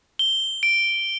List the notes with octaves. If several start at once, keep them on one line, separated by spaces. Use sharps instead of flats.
G7
D7